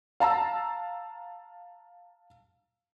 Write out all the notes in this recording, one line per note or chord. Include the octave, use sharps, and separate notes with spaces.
F5 A5 A#5 E6